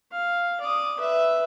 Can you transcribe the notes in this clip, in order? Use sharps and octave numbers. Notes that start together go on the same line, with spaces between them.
F5
D5 D#6
B4 E5